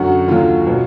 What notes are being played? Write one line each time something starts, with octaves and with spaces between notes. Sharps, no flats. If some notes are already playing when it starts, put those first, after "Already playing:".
Already playing: F#2 D3 F#3 F#4
D#2 D3 F#3 F4
B2 F#3